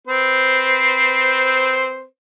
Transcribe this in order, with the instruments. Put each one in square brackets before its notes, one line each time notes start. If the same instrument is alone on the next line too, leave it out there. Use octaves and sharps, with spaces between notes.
[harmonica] C4 B4 C5